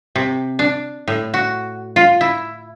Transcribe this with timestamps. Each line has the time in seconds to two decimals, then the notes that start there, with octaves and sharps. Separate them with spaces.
0.16 C3
0.59 D4
1.08 A2
1.34 F#4
1.96 F4
2.21 E4